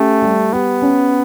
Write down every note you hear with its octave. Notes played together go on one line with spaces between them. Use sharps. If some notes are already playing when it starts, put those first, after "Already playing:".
Already playing: A3 C#4 G4
G3
B3 G4
C#4